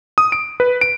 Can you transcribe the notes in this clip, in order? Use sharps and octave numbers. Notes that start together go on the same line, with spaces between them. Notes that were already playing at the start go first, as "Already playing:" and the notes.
D#6
D7
B4
D7